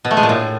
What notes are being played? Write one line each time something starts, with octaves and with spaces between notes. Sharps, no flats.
B2
A3
G#3
A#2
A2